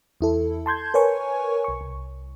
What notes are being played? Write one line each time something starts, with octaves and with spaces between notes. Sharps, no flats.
E2 E4 A4
A5 C6 G6 G#6
A#4 B4 C#5 G#5 C#6
B1 C#6
C2